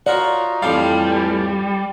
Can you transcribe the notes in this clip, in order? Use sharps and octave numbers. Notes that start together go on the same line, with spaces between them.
D#4 F4 F#4 A#4 C#5 D5 F#5
F2 A2 E3 F3 G3 F5